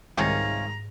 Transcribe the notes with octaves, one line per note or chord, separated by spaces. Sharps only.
C2 G#2 C3 D#3 G#3 C#4 F4 A#5